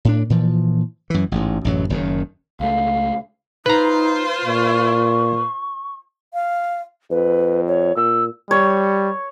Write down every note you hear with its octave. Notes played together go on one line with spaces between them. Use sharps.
A2 D4
A#2 E3 F3
F#2 E3
A1 G#2
A1 F#2 F#3
F#1 F#2 D#3
C#2 A3 F5
D#4 F4 B4 C5 A#5
A#2 C#6
F5
F2 B4
C#5
A#2 E6
G3 C#5